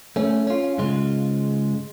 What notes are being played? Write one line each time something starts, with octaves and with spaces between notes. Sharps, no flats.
A3 C#4
C#4 F4
G#2 C#3 G#3 F4